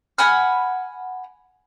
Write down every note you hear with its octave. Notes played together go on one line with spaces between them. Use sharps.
F#5 G#5 B5 F6